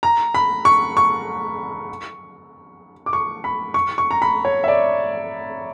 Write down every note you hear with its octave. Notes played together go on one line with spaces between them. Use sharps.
A#5
B5
C#6
C#6
D6
C#6
B5
C#6
C#6
A#5
B5
C#5
E5
D5